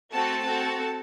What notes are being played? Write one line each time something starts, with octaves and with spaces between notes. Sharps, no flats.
A3 C4 F#4 A4 A5
C4 F#4 A4